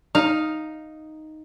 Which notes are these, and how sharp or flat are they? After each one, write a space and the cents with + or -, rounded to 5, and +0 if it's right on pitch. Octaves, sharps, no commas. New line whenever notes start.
D#4 +0 F5 +0